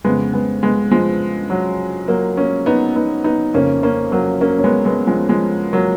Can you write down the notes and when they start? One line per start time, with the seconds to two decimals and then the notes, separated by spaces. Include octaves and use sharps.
0.04 F2 C#3 G#3 B3
0.33 G#3 B3
0.63 G#3 B3
0.91 F3 G#3
1.50 F#3
2.08 F#3 A#3
2.37 A#3 C#4
2.66 B3 D#4
2.96 B3 D#4
3.24 B3 D#4
3.54 F2 C#3 A#3 C#4
3.83 A#3 C#4
4.12 F#3 A#3
4.41 A#3 C#4
4.59 C#4
4.64 G#3 B3
4.85 G#3 B3
5.07 F3 G#3
5.29 F3 G#3
5.73 F#3 A#3